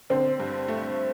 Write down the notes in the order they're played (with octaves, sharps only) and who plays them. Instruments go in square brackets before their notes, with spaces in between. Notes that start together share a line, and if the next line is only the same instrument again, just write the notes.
[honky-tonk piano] D3 [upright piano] C4
[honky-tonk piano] G2
A3